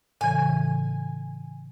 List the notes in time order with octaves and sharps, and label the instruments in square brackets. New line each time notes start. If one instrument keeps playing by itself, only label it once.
[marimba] A2 C#3 E3 [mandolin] G#5